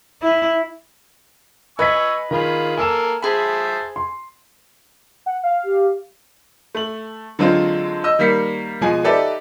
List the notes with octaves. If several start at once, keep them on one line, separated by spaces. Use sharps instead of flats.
E4
B4 D#5 G#5 C#6 E6 G#6 B6
D#3 F4 G#4 B5
A#3 A4 A#4 G#5 E6 E7
G#4 C5 E5 A5 B5
C6
F#5
F5
G4
A3 F#7
D3 F#3 G#3 C4 F4
D#5 E6
D#3 G3 A#3 B6 C#7
B2 F3 G#3 G#5
D#4 G4 A4 B4 D5 E5